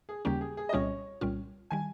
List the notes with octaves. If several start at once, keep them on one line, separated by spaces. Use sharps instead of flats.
G#4
D#2 C#3 G3 A#3 C#4 G4
G#4
G#4
D#5
C2 A#2 G3 C#4 F4 C#5
C2 A#2 G3 C#4 F4
D#3 G3 G#5